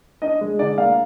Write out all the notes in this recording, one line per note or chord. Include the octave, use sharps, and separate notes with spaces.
D4 D#5
G#3
D3 D5
A#3 F5